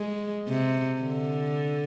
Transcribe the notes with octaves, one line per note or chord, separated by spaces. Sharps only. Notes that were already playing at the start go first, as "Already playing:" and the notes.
Already playing: G#3
C3
D3